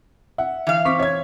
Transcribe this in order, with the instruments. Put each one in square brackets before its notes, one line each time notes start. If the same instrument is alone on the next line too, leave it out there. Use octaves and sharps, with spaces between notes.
[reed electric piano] E5 [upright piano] F#5
[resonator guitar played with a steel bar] E3 F5
[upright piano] C4 D6 B6 [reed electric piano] C#6
[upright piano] C#5 E5 G#6